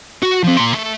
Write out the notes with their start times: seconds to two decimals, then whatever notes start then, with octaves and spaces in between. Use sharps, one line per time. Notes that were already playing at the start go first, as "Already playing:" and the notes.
0.23 F#4
0.44 F3 C4
0.57 A#2 C6
0.74 A3